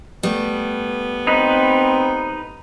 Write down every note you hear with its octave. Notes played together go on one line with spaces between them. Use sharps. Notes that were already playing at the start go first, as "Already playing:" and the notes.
G3 A3 B3
C4 D#4 B4